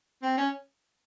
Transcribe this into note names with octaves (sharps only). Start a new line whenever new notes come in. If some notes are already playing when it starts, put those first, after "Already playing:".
C4
C#4